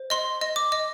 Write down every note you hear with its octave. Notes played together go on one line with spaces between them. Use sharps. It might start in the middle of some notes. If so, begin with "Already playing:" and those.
Already playing: C5
D#5 C6
D#5
D6
D#5